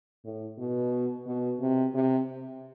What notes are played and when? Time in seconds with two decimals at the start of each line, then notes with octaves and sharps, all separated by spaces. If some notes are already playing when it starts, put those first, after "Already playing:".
0.24 A2
0.58 B2
1.26 B2
1.61 C3
1.94 C3